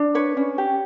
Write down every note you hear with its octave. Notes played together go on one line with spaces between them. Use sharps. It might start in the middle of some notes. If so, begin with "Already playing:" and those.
Already playing: D4
B4 C#5
C#4
G4